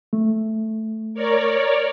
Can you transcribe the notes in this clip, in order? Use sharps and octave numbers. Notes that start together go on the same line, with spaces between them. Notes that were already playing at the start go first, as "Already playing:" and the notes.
A3
A#4 C#5 D5